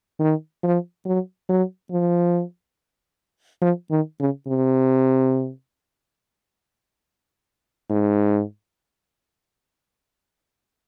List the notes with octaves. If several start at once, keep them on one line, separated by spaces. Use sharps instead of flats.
D#3
F3
F#3
F#3
F3
F3
D#3
C#3
C3
G#2